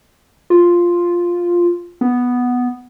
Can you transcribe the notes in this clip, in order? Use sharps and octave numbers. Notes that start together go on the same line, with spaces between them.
F4
B3